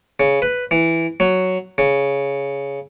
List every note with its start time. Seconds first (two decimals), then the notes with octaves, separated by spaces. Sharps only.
0.20 C#3
0.42 B4
0.71 E3
1.20 F#3
1.78 C#3